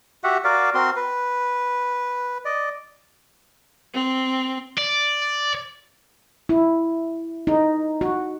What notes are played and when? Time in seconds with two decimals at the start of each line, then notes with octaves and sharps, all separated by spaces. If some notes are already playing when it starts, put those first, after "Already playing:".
0.24 F#4 G4 E5 F#5
0.44 F#4 A#4 D5 F5
0.75 C4 F#4 A#4 C6
0.96 B4
2.45 D5 D#5
3.94 C4
4.78 D5
6.49 E4
7.47 D#4
8.01 F#4